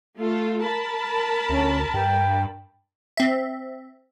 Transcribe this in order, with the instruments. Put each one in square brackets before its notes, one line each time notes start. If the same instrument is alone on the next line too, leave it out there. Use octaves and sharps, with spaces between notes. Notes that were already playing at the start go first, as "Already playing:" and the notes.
[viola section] A3 F4 A4
A#4 A5 B5
[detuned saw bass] D2 [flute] C#4
[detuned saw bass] G2 [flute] G5
[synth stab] C4 E5